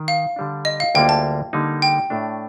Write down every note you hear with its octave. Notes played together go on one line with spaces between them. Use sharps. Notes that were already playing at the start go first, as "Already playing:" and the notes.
Already playing: D#3
F5
D3 G3 D4
D#5
F5
D2 D3 G3 A#3 F4 G5
A5
D3 G3 A#3 D#4
G5
A2 A3 D4